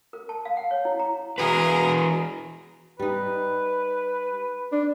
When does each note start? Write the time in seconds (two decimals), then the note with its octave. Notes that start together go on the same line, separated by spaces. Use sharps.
0.13 A#4
0.29 A5
0.45 F5
0.57 F#5
0.71 C#5
0.85 E4
1.00 A#5
1.38 E3 F#4 G#4 A#4 B4
2.99 G3 D#4 B4
4.72 D4